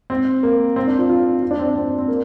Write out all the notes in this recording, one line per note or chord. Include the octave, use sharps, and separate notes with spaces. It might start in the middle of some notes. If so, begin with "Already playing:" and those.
C4
A#3
C4
D4
F4
F4
F4
D4
C4
D4
C4
C4
A#3